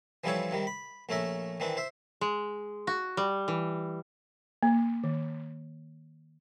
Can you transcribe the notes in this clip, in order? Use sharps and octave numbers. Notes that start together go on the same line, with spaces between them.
E3 F3 G3 C4 A4 C#5
C3 D#3 G3
B5
A#1 A3 C#4 A#4 E5
D#3 E3 C4 D4
C5 E5
G#3
F#4
G3
E3
A#3
D#3